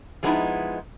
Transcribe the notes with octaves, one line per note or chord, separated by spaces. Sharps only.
F3 G#3 B3 C#4 D#4 E4